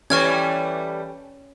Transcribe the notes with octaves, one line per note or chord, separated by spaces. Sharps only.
E3 G3 A3 C#4 C#6 F6 G#6